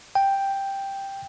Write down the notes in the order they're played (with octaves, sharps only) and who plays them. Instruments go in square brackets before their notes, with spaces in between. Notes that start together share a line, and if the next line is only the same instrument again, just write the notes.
[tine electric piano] G5